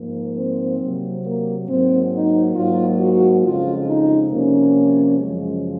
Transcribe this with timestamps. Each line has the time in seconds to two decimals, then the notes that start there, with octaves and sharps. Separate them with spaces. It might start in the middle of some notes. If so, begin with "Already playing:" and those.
Already playing: G#2 F3 A#3
0.36 C4
0.80 C3 F#3 A#3
1.24 A#3
1.67 G#2 F#3 A#3 C4
2.12 D#4
2.55 G#2 F#3 A#3 F4
2.99 F#4
3.43 F2 C#3 G#3 F4
3.86 D#4
4.30 C3 F3 A#3 C#4
5.17 F#2 C#3 F3 G#3